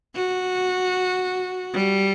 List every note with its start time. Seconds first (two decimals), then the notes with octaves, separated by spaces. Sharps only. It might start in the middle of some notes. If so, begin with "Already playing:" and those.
0.16 F#4
1.74 G3